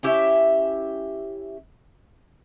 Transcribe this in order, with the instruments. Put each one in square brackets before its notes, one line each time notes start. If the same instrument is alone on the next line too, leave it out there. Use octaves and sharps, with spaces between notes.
[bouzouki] C#4 E4 G4 E5